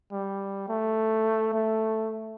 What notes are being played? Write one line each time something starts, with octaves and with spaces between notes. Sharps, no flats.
G3
A3
A3